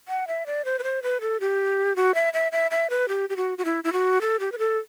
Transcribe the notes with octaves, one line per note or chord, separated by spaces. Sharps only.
F#5
E5
D5
C5
B4
C5
B4
A4
G4
F#4
E5
E5
E5
E5
B4
G4
G4
F#4
F#4
E4
E4
F#4
A4
G4
B4
A4